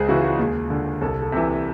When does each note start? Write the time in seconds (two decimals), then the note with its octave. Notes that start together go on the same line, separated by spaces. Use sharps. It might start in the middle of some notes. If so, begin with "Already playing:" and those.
Already playing: C#2 G#4 C5
0.08 C#3 E3 F#4
0.24 F#4
0.39 D#2 G#4
0.70 D3
1.01 C2 A4
1.22 A4
1.32 C3 E3